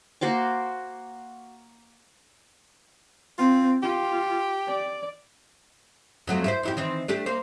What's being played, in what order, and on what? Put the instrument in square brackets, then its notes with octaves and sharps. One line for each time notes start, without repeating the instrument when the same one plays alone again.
[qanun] A#3 F#4 C5 D6
[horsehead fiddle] C4 [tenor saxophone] F4
[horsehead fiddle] F4 [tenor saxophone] G4
[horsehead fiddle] D5
[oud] F2 F#3 A3
E4 F#4 C5
F2 E4 G4
D#3 E3 C4
A3 D4 G4
A#3 C5